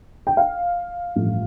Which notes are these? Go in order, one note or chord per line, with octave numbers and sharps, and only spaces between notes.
G5
F5
A1 G2 F3 A3